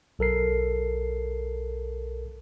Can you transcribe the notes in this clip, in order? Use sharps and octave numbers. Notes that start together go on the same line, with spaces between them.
B1 A4 A#4 C7